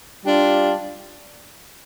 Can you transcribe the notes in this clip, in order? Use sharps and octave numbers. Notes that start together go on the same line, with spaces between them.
G3 D4 F4